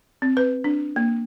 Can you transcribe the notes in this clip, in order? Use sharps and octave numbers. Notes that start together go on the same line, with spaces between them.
C4
B4
D4
A#3